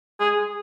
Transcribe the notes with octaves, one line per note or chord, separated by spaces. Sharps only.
G#4